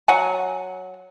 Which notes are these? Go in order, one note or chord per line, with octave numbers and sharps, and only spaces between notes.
F#3 F#5 G#5